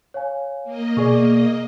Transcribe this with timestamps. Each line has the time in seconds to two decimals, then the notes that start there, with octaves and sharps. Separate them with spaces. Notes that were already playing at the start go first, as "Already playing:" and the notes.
0.14 C#5 F5 G#5
0.64 A#3 D#5
0.97 B2 G#4 D5 C#6